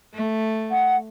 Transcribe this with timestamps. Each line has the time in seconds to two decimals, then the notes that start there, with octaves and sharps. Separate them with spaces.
0.14 A3
0.71 F#5